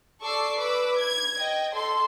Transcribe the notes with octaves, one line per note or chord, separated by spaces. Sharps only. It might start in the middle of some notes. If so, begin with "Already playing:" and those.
A4 D5 C#6 D6 E6 C7
B4 D6 E6
G#6
D#5 G5
A4 C6